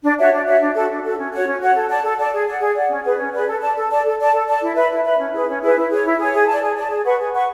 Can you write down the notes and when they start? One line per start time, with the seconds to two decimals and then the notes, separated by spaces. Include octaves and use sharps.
0.03 D4
0.18 F#4 C#5 E5
0.32 D4
0.46 F#4 C#5 E5
0.61 D4
0.74 F#4 A4
0.90 D4
1.04 F#4 A4
1.18 C#4
1.32 F#4 C#5 F#5
1.47 C#4
1.61 F#4 C#5 F#5
1.74 A4
1.89 D5 A5
2.04 A4
2.18 D5 A5
2.32 G#4
2.46 D5 F#5
2.61 G#4
2.75 D5 F#5
2.89 C#4
3.04 G#4 B4 D5
3.18 C#4
3.33 G#4 B4 D5
3.47 A4
3.61 D5 A5
3.76 A4
3.90 D5 A5
4.04 A4
4.19 D5 A5
4.33 A4
4.47 D5 A5
4.62 E4
4.75 B4 E5 B5
4.90 E4
5.04 B4 E5 B5
5.19 C#4
5.33 E4 G#4 B4
5.47 C#4
5.61 E4 G#4 B4
5.76 E4
5.90 G#4 C#5
6.04 E4
6.19 G#4 C#5
6.33 G#4
6.47 D5 A5
6.62 G#4
6.76 D5 A5
6.90 G#4
7.05 B4 F#5 C#6
7.19 G#4
7.33 B4 F#5 C#6